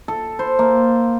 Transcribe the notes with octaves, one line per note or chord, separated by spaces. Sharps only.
A4
C5
A#3